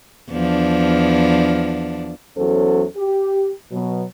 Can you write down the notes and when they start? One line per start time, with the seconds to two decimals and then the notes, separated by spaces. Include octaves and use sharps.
0.31 E2 F3 D4
2.36 E2 F#3 C#4 A4 C5
2.97 G4
3.72 B2 F#3